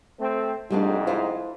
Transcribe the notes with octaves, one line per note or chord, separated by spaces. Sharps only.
A3 C4
C2 F2 G#2 G3 A3 D4
E4 F4 C5